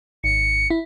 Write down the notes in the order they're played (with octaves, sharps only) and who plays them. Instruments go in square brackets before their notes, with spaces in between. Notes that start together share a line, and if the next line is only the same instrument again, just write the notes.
[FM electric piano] G#1 [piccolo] C#7
[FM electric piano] E4